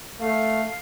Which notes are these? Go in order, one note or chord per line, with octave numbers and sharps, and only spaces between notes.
A3 F5